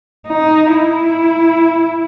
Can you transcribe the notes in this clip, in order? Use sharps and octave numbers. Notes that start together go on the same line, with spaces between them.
D#4
E4